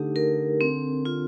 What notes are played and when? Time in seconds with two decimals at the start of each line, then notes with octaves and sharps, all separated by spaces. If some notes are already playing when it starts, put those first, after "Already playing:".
Already playing: D3 A3 D#4 G4
0.16 A#4
0.61 C4
1.05 F4